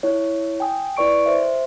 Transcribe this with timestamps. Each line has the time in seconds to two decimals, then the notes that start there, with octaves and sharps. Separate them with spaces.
0.03 E4 C#5
0.60 G5 G#5 D#6
0.97 E4 B4 D5 C#6 D7
1.26 C5 E5